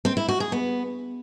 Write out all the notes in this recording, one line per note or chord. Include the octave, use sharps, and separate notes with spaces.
C4
E4
F#4
G#4
B3